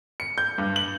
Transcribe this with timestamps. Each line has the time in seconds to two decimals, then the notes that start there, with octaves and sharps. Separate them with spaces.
0.20 C#7
0.38 G6
0.58 G2
0.76 F#7